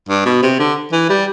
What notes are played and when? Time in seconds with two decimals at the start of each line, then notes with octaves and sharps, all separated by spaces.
0.09 G2
0.25 B2
0.42 C3
0.59 D3
0.92 E3
1.09 G3